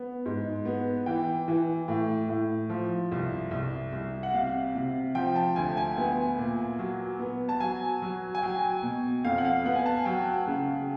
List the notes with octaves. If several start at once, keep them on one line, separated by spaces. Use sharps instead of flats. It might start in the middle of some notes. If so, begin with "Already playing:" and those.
Already playing: B3
G#2
B3
E3 G5
E3
A2
A2
F3
C2
C2
C2
F#5
C3 F5
C3
F3 G5
A5
D2 G#5
G#5
B3 G#5
A#2
F#3
B3
A5
F#3 G#5
F#3
G#5
F#3 G5
B2
F2 F5
F#5
F5
B3 F#5
G#5
A5
F#3 G5
C#3